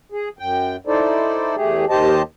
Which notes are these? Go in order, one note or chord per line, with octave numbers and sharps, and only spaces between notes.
G#4
F#2 G5
D#4 E4 A4 C5 D5
E2 A3 G4 G#4
D#2 D#3 G4 C5 D#5 A5